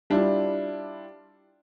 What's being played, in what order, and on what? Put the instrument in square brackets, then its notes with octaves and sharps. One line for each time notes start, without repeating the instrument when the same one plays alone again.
[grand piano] G3 D4 E4 F4